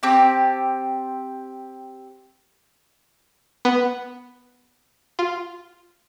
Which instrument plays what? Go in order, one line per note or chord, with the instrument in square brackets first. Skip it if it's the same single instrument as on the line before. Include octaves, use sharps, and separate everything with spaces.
[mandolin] C4 G4 A5
[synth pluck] B3
F4